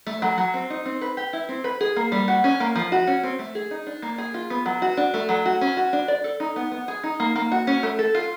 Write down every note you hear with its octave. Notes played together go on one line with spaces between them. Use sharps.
A3
F#3
F#3
C4
D#4
C4
B4
G4
E4
C4
B4
G#4
A#3
G3
F#4
C#4
A#3
F3
F#4
C#4
C4
A3
G#4
D#4
D4
A#3
G#4
F4
B3
F#3
F#4
D4
A3
F#3
F#4
C#4
F#4
D4
D5
A4
D#4
B3
B3
G#4
D#4
A#3
A#3
F#4
C#4
A3
A4
F4